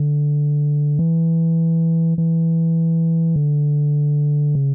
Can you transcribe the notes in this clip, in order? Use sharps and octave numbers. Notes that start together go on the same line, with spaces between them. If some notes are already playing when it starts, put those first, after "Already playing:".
Already playing: D3
E3
E3
D3
C#3